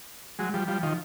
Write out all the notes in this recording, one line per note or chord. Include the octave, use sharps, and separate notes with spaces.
F#3 G#3
F3 G3
F3 G3
D#3 F3